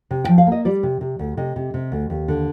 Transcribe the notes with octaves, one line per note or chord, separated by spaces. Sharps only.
C3
F3 G5
F5
A#3 D#5
G3 D5
C3
C3
D2
C3 D#5
C3
C3
D2
D#2
D3